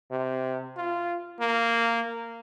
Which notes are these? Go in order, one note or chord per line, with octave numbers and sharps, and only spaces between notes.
C3
F4
A#3